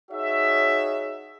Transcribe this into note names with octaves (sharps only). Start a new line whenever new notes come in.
D#4 F#4 G#4 C#5 E5